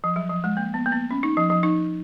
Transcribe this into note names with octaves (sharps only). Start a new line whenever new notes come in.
F3
F#3
F3
G#3
A#3
B3
A#3
B3
C#4
D#4
F3
F3
D#4